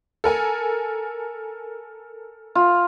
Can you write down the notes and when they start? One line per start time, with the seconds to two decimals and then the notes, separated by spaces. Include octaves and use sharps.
0.24 A4 A#4 G#5
2.55 F4